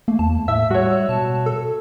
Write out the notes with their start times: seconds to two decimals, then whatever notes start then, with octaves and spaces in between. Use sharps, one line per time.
0.08 A3 A#3
0.19 E2 A5
0.48 A2 E5 E6
0.70 G3 F#4 C#5
1.09 B2 A5
1.46 A4